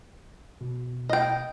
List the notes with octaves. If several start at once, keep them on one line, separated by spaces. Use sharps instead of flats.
B2
D#5 G5